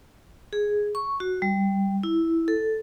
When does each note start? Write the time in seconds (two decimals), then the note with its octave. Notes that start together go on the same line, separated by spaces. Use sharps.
0.53 G#4
0.95 C#6
1.20 F#4
1.42 G3
2.03 E4
2.48 A4